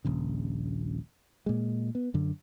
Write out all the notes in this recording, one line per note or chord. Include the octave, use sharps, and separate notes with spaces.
D#1 A#1 C#3
A#2 G#3
B3
F#2 D3